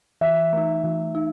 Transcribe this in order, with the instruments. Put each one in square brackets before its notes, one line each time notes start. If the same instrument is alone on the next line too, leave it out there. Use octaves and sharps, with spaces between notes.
[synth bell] E3 [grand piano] E5
[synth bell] A3 D#4
E3
D#4